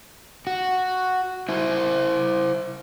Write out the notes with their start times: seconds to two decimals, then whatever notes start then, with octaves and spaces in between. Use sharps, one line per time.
0.47 F#4
1.49 E4 C5 E5